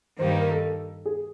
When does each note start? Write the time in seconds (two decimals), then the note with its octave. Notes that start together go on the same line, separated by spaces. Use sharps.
0.19 G2 D#3 G3 A#3 D#4 C5
0.29 B4
0.40 A#4
0.51 A4
1.06 G#4